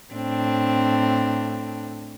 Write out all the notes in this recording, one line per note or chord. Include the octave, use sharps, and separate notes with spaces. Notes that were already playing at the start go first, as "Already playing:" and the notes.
A2 C4 D4